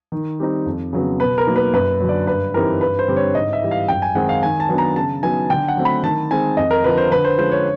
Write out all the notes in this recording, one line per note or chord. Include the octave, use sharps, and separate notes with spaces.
D#3
G3 C4 D#4
F2
C#3 F#3 B3
B2 B4
A#4
F#3 A#3 D#4
B4
F#2 B4
D3 F#3
D5
G2 B4
E3 G3 C4 D#4 A#4
G2 B4
C5
D3 G3 C4
C#5
G#2 D#5
E5
E3 G3
F5
F#2 G5
G#5
D#3 G#3 C4 D#4 F#5
F5
D#3 G#5
A5
F#3 B3 D4
A#5
C#3 A5
F#3 B3 D#4 G#5
D3 G5
F#5
F#3 A3 C4
B5
D#3 A5
G#3 C4 D#4 G#5
F2 D#5
A#4
D3 F3 B4
C5
D3 B4
C5
F3 G#3 C#4 C5
C#5